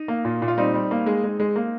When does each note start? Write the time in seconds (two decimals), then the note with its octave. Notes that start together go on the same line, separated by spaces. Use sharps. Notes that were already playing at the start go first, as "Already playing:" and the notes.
Already playing: D#4
0.08 A#3
0.25 A#2
0.42 A#2
0.48 F4
0.58 G3 C4 D#4
0.74 G3
0.91 A#3
1.06 G#3
1.24 G#3
1.40 G#3
1.56 A#3